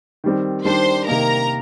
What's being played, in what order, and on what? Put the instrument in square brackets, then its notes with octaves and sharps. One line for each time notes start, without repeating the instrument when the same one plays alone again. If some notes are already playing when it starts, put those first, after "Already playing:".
[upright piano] D#3 G3 C4
[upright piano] D#3 G3 D4 [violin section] C5 C6
[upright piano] C3 D#3 A#3 D#4 [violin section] A#4 A#5